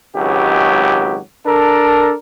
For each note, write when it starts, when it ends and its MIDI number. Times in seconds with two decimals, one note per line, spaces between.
0.15 1.18 32
0.15 1.18 37
0.15 1.18 54
0.15 1.18 67
1.46 2.14 62
1.46 2.14 69
1.46 2.14 70